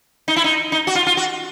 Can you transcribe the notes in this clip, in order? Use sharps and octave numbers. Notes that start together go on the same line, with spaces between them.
D#4
E4
D#4
D#4
F#4
F4
F4
F#4